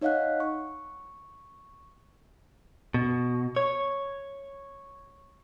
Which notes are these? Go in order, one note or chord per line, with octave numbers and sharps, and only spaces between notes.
D#4 C#5 D#5 F5 F#5 F#6
C#6
B2
C#5